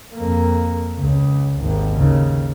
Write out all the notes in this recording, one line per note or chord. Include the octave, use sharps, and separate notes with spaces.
F2 A#3
C#2
G#1 D#2
D#2 C#3